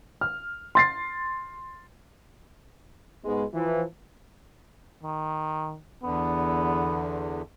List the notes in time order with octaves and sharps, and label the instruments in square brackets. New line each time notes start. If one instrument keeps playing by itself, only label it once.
[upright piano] F6
C6 A6 C7
[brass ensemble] G#2 B2 G#3
E3 F3
[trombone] D#3
[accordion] E2 D3 [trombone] B3